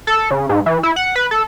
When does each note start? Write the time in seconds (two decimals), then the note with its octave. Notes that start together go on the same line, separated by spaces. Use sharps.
0.07 A4
0.31 C#3
0.49 G#2
0.66 E3
0.83 E4
0.96 F#5
1.16 B4
1.31 A4